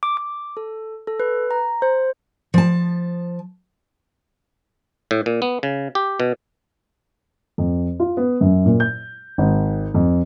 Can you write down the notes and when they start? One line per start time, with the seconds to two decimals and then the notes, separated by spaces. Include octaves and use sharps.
0.03 D6
0.17 D6
0.57 A4
1.07 A4
1.20 B4
1.51 A#5
1.82 C5
2.54 F3 A5
5.11 A2
5.26 A#2
5.42 B3
5.63 C#3
5.95 G4
6.20 B2
7.58 F2
8.00 F4
8.17 B3
8.41 F#2
8.66 A#2
8.80 G6
9.38 G#1
9.94 F2